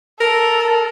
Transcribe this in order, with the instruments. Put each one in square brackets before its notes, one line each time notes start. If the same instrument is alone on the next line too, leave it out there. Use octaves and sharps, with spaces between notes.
[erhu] A4 [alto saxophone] A#4